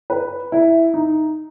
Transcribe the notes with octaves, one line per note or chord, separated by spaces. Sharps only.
B4
E4
D#4